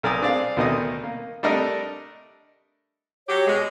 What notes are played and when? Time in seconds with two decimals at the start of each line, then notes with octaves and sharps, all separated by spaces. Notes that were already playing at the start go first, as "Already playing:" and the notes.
0.03 B1 A#4 D5 G#5 D#6
0.22 C4 D4 G#4 D5 F5
0.57 D2 B2 D#3 A3 D#5 D#6
1.03 A#3
1.43 G3 A3 D4 A4 A#4 D#5
3.28 F#3 G4 C#5
3.46 B2 G#3